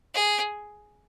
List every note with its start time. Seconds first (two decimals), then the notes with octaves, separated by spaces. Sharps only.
0.14 G#4